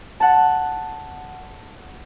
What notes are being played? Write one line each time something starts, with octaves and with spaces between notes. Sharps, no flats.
F#5 A5